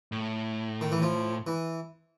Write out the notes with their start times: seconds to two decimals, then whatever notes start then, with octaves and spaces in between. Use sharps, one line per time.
0.12 A2
0.81 D#3
0.92 E3
1.02 F3
1.47 E3